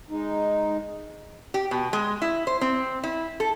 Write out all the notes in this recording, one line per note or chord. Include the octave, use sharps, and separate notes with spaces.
G#3 D#4
G4
B2
G#3
E4
C5
C4
E4
A4